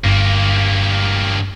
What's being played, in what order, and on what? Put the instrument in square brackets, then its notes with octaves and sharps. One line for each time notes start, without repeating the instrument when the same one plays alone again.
[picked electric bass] G1 [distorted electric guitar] G2 A#3